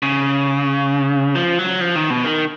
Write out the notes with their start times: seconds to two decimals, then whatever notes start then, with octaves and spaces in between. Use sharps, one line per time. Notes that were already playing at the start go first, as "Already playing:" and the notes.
0.02 C#3
1.35 F3
1.59 F#3
1.81 F3
1.95 D#3
2.10 B2
2.25 D#3